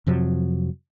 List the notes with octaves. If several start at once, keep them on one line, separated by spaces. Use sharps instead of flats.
F2 C3 F3 F#3